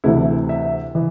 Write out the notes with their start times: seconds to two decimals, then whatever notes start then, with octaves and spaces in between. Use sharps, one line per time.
0.04 D2 C3 E3 E4
0.49 E5
0.95 E3